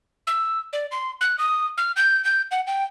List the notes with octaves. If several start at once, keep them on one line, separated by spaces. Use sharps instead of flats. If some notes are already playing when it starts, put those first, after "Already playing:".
E6
D5
C6
F#6
D#6
F6
G6
G6
F#5
G5